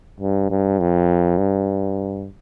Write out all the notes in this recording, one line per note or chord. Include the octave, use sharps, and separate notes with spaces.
G2
G2
F2
G2